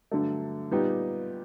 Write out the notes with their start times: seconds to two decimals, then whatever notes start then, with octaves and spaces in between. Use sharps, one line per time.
0.11 G2 D3 F#3 A3
0.71 A#2 G3 B3 D#4 G4